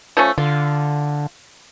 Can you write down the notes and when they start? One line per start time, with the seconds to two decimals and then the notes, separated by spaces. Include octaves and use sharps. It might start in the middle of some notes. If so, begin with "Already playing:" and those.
0.17 F3 A3 C#4
0.38 D3 F4